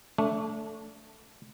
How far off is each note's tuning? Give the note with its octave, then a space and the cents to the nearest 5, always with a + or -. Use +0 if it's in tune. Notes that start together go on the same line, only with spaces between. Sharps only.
A3 +0 D4 -25